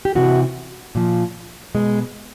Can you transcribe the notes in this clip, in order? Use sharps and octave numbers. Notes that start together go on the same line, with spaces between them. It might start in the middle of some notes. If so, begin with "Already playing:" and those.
G4
C3 E3 F#4
A#2 F3
B2 G#3